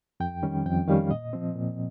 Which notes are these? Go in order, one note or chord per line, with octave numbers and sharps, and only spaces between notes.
F2 G5
D#3 G3 C#4
F2 G5
D#3 G3 C#4 F5
A#2 D#5
F3 C4
A#2